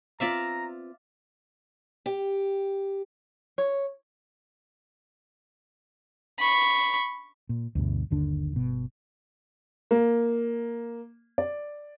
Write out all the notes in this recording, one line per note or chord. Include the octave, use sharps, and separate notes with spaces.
B3 C4 F4 D5 E5 F5 A#5
G4
C#5
B5 C#6
A#2
D2 G2 B2
G1 D#2 D3 D4
G1 B2
A#3
D5